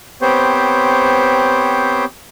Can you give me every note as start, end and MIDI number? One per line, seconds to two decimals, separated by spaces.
0.22 2.05 59
0.22 2.05 60
0.22 2.05 67
0.22 2.05 72
0.22 2.05 73